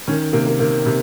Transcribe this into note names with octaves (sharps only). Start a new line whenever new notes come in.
D#3 C#4
C3 A#3
A#3
D#3 A#3
C3